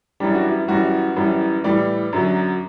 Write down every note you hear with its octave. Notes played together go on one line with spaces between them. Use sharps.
F#2 E3 G3 D4
F#4
E4
F#2 E3 G3 F#4
F#2 E3 G3
A2 E3 G3 D5
F#2 D3 F#3